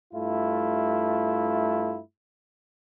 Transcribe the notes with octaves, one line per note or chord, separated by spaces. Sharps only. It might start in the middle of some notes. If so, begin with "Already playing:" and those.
G2 A3 E4 F4